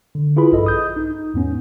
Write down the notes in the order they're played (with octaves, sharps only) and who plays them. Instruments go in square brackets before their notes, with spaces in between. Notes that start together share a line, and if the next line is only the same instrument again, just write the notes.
[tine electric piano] D3
E4 F4 G#4 B4 B5
A#1 G2 A4 D#5
D#6 G6
D#4
E2 G#2 B3 C#4